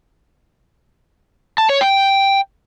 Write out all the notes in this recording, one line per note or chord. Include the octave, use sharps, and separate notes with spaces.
A5
C#5
G5